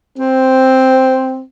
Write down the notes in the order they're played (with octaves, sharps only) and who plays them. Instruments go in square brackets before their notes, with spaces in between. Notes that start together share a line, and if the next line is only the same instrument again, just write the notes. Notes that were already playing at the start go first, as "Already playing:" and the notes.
[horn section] C4